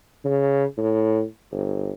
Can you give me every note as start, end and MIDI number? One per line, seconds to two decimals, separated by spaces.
0.24 0.65 49
0.77 1.22 45
1.52 1.91 31